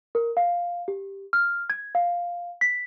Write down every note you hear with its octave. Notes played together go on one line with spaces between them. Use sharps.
A#4
F5
G4
F6
G#6
F5
B6